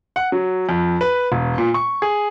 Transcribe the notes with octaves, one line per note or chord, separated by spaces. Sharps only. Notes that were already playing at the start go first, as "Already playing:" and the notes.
F#5
F#3
F2
B4
E1
A#2
C#6
G#4